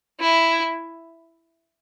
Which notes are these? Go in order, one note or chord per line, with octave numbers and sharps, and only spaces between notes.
E4